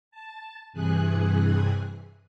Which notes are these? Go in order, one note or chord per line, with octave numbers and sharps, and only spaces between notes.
A5
G2 C3 E3 G#4 G#5 F#6